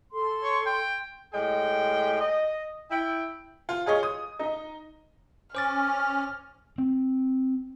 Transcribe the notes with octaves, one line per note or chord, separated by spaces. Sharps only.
A4 C6
C#5
G5
A2 G#3 G4 G#4 G5
D#5
E4 G5
F4
F4 G#4 C#5 D#5
D#6
D#4 D#5
C#4 C5 D6 F6 A6
C4